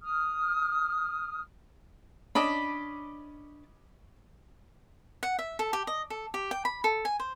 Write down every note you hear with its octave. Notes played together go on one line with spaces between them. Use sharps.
D#6 F6
C#4 D4 D5 D#5 A5 B5
F#5
E5
A4
G4
D#5
A4
G4
G5
B5
A4
G#5
C5